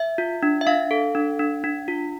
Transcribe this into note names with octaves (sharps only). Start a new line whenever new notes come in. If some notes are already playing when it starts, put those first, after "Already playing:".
Already playing: E5
F4
D4
E5
D4 F5
A4
D4
D4
D4
F4